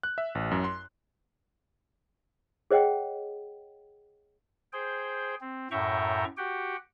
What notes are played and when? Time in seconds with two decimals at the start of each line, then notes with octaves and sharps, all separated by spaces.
0.03 F#6
0.18 E5
0.35 A1
0.51 F#2
0.64 C6
2.71 G#4 C#5 D#5 F#5 G5
4.73 G#4 C5 G5
5.41 C4
5.71 F#2 A2 E5 G5 A#5 C#6
6.37 F#4 G4 F#5 G5